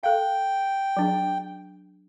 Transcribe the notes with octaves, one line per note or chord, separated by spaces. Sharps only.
A4 F5 G5
F#3 D4 G#4